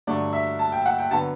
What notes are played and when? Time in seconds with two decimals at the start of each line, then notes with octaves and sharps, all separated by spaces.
0.07 G2 D3 F#3 A3 D5
0.33 E5
0.59 A5
0.72 G5
0.86 F#5
0.98 G5
1.11 D3 F#3 B3 A5